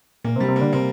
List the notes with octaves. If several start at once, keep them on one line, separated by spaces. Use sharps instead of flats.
A#2 A#3
C3
G3
C3
A#3
D3
C3 A#3